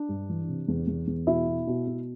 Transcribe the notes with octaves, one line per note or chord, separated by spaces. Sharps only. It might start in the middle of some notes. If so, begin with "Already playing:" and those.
Already playing: D4
G2
E3
C3
E2
E2
E2
B2 E4
B2
B2
B2